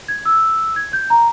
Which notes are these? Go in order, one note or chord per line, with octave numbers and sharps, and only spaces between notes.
G#6
E6
G#6
G6
A#5